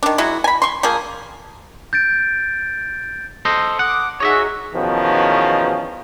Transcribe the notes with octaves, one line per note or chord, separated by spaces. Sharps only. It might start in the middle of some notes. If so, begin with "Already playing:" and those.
D#3 D4
F#3 G#3 E4 F#4
G#5 B5
C6 C#6
F3 A#3 G#4
G6 A6 D7
A4 C5 D#5
F#5 D6 D#6
D#4 F#4 G#4 C#5 D#5 E5
E2 B2 D#3 F3 C#4